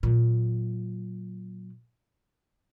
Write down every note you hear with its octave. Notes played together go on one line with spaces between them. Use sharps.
A#2 F#3